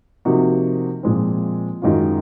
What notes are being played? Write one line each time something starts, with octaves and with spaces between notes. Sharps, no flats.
C3 F3 A#3 D#4 F#4
A#2 F3 G#3 C4
F#2 D#3 G#3 C#4 F4